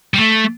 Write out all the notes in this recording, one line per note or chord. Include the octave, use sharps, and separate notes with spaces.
G3
A3